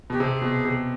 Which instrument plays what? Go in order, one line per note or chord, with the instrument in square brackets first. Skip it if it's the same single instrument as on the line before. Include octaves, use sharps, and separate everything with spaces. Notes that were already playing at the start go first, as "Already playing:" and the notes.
[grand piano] B2 [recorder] G4
[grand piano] C3 [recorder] G#4
[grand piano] B2
C3